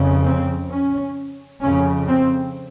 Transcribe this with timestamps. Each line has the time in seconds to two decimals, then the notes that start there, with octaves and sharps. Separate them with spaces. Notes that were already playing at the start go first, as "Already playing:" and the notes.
Already playing: F2 C#3
0.25 C4
0.70 C#4
1.62 F2 C#3 C#4
2.08 C4